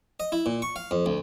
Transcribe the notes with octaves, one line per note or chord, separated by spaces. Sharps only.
D#5
E4
A#2
C#6
F5
F2
D2